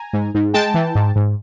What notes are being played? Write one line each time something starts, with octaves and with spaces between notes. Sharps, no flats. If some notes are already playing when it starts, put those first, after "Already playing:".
Already playing: G#5 A#5
G#2
G#2
G#3 G5 A5
E3
G#2
G#2